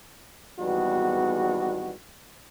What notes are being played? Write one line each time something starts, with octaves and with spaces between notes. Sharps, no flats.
G#1 E2 G3 B3 D#4 F#4